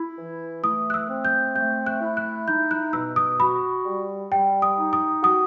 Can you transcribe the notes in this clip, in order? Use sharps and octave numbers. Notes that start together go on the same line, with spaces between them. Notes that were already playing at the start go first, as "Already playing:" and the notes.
Already playing: E4
E3
A3 D#6
F#6
E6
C4
G6
A3 G6
F#6
E4
F#6
D#4 G6
F#6
B2 E6
D#6
F#4 B5
G3
G3 G5
D#6
D#4
D#6
F#4 D#6